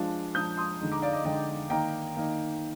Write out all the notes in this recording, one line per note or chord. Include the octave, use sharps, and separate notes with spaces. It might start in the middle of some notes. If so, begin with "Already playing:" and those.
Already playing: F3 G#3 D4 F4
F3 G#3 D4 F4 D#6 G6
C6 D#6
D3 G#3 D#4
A#5 D6
D5 F5
D#5
D3 G#3 D#4 D#5 G5
D#3 A#3 D#4 G5 A#5
D#3 A#3 D#4